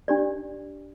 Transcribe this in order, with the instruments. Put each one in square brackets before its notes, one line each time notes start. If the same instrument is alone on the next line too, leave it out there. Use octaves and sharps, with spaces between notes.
[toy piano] D4 G4 D5